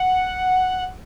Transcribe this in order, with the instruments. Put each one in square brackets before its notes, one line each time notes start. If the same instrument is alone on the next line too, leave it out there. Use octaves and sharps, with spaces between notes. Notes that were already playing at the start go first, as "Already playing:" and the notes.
Already playing: [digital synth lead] F#5